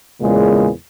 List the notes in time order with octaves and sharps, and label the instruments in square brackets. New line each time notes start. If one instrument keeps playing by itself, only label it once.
[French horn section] E2 A#2 C#3 G#3